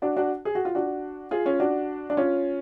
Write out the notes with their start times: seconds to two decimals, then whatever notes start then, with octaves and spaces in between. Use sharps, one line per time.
0.02 D4 F#4
0.17 D4 F#4
0.45 G#4
0.55 F#4
0.65 F4
0.75 D4 F#4
1.31 F4 G#4
1.45 C#4 F4
1.60 D4 F#4
2.10 D4
2.17 C#4 F4